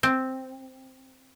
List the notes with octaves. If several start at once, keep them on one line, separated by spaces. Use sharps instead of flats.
C4